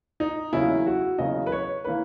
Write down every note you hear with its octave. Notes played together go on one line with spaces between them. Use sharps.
D#4
E2 C#3 F#3 A#3 E4
F#4
E2 C#3 F#3 A#3 D#5
B4
C#5
E3 A#3 B4